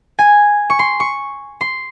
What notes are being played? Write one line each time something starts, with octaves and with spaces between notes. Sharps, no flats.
G#5
C#6
C6
C#6
C6